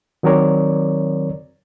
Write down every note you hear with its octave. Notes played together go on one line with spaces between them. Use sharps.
D#3 F#3 C4 A#4 C#5 D5